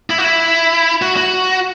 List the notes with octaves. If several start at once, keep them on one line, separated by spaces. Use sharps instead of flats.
E4
F#4
E4
F#4
F#4